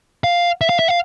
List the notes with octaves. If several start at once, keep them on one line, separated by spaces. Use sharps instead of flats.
F5
E5
F5
E5
F5